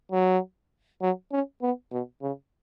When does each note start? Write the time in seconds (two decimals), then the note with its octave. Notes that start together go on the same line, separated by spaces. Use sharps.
0.12 F#3
1.02 F#3
1.32 C#4
1.62 B3
1.92 B2
2.22 C#3